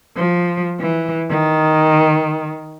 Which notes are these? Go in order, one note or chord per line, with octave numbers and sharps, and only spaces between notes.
F3
E3
D#3